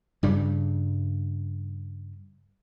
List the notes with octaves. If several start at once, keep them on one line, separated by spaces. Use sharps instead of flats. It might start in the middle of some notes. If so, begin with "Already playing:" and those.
G2 C#3 G3